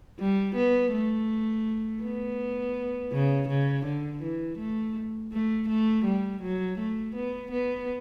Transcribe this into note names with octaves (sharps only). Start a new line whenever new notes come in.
G3
B3
A3
B3
C#3
C#3
D3
E3
A3
A3
A3
G3
F#3
A3
B3
B3